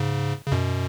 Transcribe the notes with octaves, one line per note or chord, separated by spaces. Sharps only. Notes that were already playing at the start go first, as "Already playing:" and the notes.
Already playing: G#2 C#3
C#3
F#2 B2